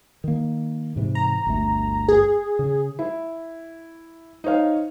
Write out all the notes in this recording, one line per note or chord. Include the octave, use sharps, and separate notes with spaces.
D#3 A#3
G#2 C3 E3
A#5
G1 D2 A3
G#4
C#3
E4
D#4 C5 C#5 F5